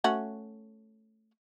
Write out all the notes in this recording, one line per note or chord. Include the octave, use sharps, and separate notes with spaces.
A3 C#4 F#4